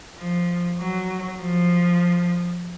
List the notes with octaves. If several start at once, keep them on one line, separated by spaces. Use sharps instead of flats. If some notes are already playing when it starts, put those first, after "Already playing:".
F3
F#3
F3